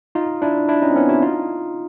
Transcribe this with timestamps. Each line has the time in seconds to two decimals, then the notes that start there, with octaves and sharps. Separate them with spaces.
0.15 D#4 F4
0.42 D4 E4
0.68 D4 E4
0.82 C#4 D#4
0.90 C4
0.96 B3 C#4
1.09 E4 F#4
1.22 D#4 F4